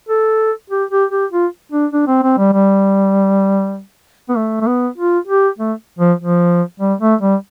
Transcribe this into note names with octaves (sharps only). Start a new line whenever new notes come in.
A4
G4
G4
G4
F4
D4
D4
C4
C4
G3
G3
B3
A3
A3
B3
F4
G4
A3
F3
F3
G3
A3
G3